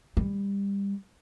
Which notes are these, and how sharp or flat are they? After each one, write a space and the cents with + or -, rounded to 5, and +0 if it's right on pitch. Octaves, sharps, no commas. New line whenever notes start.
G3 +25